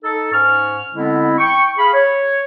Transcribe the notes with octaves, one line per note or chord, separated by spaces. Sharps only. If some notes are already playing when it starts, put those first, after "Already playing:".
D#4 A4
G#2 C#4 C#6 F6
D3 G#3 B3 C4 E4
G5 C#6
G#4 F5 B5
C#5